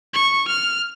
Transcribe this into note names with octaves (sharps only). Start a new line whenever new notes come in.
C#6
F6